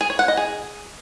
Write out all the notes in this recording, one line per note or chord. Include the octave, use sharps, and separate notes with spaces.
G#4
C#5
F#5
D#5
G#4